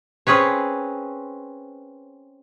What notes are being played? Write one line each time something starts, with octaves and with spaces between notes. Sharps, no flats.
C4 C#4 G#4 B4 C#5